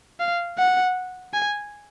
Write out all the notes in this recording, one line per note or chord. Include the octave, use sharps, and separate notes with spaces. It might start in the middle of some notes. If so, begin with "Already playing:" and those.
F5
F#5
G#5